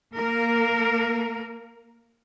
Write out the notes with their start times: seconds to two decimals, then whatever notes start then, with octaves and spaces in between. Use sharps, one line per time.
0.13 A#3 A#4